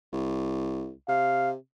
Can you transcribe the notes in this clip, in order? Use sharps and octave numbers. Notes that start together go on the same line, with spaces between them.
C2
C3 F5